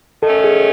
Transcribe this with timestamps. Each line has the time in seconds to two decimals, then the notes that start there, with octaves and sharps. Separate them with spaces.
0.22 D#3 F#3 A3 C#4 A4
0.44 G#4